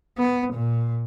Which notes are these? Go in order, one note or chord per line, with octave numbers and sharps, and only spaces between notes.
B3
A#2